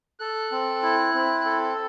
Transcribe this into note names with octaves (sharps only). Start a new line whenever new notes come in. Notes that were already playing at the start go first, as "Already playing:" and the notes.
A4 F#6
C4
E4
C4
A4